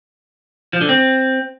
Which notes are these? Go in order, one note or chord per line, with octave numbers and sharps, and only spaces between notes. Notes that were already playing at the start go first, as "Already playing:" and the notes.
F3
D3
C4